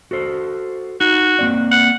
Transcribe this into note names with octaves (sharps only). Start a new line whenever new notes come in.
F#4 A4 C5
D#4 F#4
A#3 C4 D5
F#5